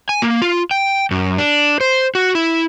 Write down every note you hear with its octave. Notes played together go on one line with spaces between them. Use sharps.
G#5
A#3
F4
G5
F#2
D4
C5
F#4
E4